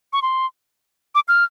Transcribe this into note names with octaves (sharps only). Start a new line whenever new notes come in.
C#6
C6
D6
F6